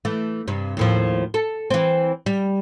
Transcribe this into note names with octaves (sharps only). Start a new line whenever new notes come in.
E3 A3
G2 C3
D#2 A2 F3
A4
E3 C4
G3